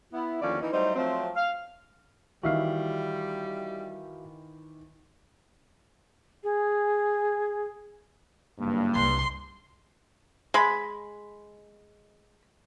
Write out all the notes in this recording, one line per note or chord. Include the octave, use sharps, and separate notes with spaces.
B3 E4
D#2 D3 F3 C#4 D5
E3 D#4
F#3 G3 A3 D#4 C5
F3 F#3 A3 C4
F5
D#3 E3 G3 F#4 E5 F5
G#4
F#1 G2 A#3
C2 C6
G#3 B5